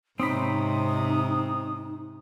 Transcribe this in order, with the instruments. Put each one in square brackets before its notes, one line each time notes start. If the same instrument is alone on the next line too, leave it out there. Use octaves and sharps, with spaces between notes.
[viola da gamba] G#2 C3 [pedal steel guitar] C4 C#4 B5 [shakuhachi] D#4 [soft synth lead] D#6